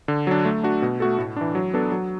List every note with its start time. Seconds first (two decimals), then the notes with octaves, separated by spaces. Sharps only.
0.08 D3
0.27 F#3 D4
0.45 A3
0.63 D4 F#4
0.82 B2
1.00 A3 F#4 A4
1.18 A2
1.36 E3 D4
1.55 F#3
1.74 B3 D4 A4
1.92 F#3